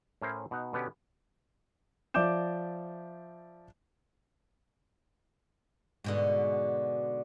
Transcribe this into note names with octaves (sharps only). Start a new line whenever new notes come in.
A2 C#4 E4 A#4 C5
B2 D#4 F#5
B2 D3 B3 C#4 G4
F3 D5 E5 D6 G6 E7
G#2 B2 D3